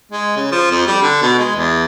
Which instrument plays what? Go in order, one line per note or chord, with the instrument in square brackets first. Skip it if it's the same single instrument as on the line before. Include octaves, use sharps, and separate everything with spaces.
[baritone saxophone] G#3
C#3
F3
F2
G3
D3
B2
G#3
E2